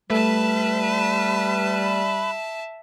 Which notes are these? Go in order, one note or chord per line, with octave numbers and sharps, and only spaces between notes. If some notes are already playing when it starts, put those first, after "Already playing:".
G3 A3 B4 E5 A5